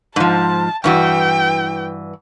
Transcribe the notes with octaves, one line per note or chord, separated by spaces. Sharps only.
G#2 F3 A5
G2 E3 F#4 G5